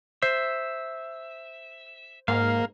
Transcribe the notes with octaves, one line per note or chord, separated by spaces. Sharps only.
C5 E5
G#2 A#3 F5